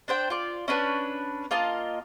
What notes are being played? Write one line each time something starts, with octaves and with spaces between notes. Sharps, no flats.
D4 C5 G5
F4 D5
C#4 D4 B4 A5
A#3 F4 D#5 A5